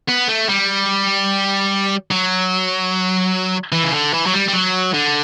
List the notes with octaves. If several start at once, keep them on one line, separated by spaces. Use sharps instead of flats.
B3
A3
G3
F#3
E3
C#3
D3
E3
F#3
G3
G3
F#3
D3